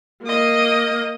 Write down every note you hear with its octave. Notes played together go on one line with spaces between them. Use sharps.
A#3 D#5